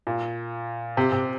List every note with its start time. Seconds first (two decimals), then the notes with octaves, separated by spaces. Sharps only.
0.07 A#2
0.97 C3
1.12 C3